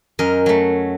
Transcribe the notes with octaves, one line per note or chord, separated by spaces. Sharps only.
F#2 A#4 D#5
F#3 A3